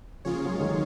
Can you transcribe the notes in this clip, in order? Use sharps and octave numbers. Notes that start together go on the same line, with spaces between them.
C#3 F3 A#3 F4 G#4 C#5
F#3
G#3
D#3 F#3